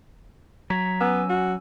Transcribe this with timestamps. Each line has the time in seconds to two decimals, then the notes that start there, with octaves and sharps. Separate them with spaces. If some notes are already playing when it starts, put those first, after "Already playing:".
0.70 F#3 A#5 G#6 B6
1.01 B3 C#4 G#5 E6
1.29 F#4